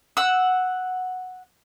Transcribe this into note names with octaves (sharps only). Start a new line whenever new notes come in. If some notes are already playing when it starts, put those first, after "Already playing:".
F#5 E6